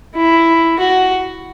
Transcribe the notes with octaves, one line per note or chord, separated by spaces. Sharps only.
E4
F#4